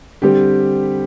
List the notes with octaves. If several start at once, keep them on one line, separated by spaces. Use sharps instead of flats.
D3 G3 C4 G4